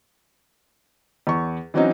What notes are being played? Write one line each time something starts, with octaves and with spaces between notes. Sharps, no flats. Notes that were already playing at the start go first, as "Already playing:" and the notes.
E2 C#6
E3 F#3 C4 C#4 D#4